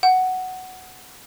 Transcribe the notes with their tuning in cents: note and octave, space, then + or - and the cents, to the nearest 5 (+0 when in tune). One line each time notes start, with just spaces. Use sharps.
F#5 +5